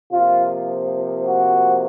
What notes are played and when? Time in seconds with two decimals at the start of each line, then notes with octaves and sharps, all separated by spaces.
0.11 C3 F3 A#3 F4
1.25 F#4